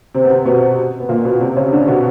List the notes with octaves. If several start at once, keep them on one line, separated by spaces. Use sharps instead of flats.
C3 C4
B3
C3 C4
B2 B3
B3
A#2 A#3
B2 B3
C3 C4
C#3 C#4
D3 D4
B2 B3